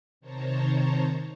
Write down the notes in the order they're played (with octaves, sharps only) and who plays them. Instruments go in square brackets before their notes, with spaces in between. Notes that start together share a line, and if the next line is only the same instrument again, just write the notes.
[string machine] C3 D#3 C5 C#5 A5 A#5